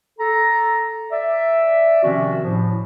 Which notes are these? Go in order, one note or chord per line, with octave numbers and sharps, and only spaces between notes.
A4 A#5
D5 E5
C3 D#3 F3 C4 C#4 F#4
A2 F3